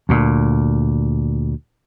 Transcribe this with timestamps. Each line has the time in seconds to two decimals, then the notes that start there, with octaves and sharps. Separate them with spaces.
0.09 D2 A#2